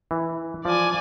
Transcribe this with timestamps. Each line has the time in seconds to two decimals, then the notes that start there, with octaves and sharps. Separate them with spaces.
0.11 E3
0.65 F3 D5 G#5